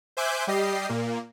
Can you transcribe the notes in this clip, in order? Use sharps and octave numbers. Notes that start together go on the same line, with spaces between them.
C5 E5 G#5 D6 F#6 G6
G3 G4 D#5 C7
A#2 A#3